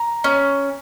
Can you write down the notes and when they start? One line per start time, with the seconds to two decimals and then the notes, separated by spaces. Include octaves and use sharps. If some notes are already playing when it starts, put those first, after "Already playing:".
Already playing: A#5
0.24 C#4